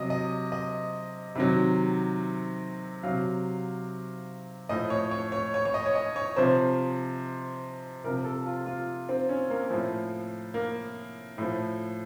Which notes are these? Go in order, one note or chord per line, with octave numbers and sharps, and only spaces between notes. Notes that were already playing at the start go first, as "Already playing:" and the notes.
Already playing: C3 F#3 D#5
D#5
D#5
C3 D#3 F#3
C3 F#3 F5
A2 F3 D#5
C#5
C#5
C#5
C#5
C#5
D#5
C#5
D#5
C#5
C3 F3 C5
C3 F3 A#4
A4
F4
F4
C4
C#4
A#3
A2 F3
A#3
A2 F3